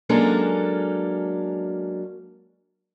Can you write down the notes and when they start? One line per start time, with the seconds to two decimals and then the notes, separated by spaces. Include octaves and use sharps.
0.09 F#3 G#3 A#3 C#4 D4 A4